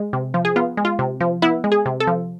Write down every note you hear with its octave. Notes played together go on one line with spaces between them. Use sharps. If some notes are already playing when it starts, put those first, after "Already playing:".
Already playing: G#3
C3
F3
G#4
B3 F4
G#3
F4
C3
F3
B3 E4
G#3
G#4
C3
A4
F3